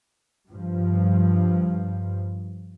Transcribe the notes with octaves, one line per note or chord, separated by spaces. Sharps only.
G2 F3